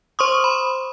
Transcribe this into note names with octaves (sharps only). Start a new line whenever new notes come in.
C5 C6 C#6 D#6
B5